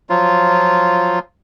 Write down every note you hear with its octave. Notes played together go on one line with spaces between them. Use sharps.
F3 F#3 F4